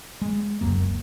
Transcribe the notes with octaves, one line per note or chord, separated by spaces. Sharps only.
G#3
E1 C#2 F#2 A#3